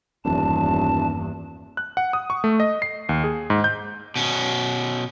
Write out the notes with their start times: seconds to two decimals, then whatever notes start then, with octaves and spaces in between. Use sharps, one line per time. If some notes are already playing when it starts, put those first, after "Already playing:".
0.25 D#1 E2 G2 A5
1.77 F#6
1.97 F#5
2.13 D#6
2.30 C#6
2.44 A3
2.60 D#5
2.82 C7
3.09 D#2
3.24 G#4
3.50 G#2
3.64 G6
4.16 B2 C#4